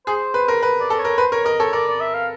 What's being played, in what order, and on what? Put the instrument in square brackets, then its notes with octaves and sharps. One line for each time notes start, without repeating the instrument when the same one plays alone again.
[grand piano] G#4 [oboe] C5
[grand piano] B4
A#4
B4
[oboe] D5
[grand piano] A4
[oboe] C#5
[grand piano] A#4
[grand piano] B4 [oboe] C5
[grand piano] A#4 [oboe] C#5
[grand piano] A#4 [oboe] D#5
[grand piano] A4 [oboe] C#5
[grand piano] A#4 [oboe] D5
[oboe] D5
E5
F5